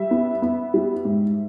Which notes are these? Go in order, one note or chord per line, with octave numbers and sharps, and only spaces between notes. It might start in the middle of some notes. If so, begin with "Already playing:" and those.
Already playing: G3 E5
B3
B3
G3
G#2